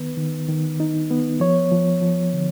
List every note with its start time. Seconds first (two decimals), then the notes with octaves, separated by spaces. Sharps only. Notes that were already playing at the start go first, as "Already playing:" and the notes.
Already playing: D#3 B3 B4
0.17 D#3
0.49 D#3
0.80 D#4
1.11 B3
1.40 F3 C#5
1.72 F3
2.01 F3
2.33 D3